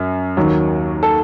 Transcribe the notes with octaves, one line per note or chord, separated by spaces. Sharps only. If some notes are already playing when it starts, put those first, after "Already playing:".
Already playing: F#2
D#2 D#3 F#3
A4